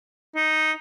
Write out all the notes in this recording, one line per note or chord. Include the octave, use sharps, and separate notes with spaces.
D#4